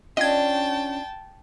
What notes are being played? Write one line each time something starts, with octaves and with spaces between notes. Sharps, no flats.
C#4 D4 F4 D#5 G5 A5 G#6